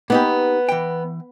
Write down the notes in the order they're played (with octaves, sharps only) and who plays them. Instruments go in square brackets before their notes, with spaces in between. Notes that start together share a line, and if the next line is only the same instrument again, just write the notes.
[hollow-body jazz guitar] A#3 D#4 G4 [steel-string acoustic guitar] B3
[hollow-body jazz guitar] E3 G5